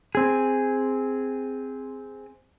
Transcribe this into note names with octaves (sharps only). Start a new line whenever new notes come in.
C4 G#4